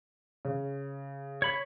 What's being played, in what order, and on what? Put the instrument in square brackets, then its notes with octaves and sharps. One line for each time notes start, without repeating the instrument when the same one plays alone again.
[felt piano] C#3
[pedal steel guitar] C#5 B5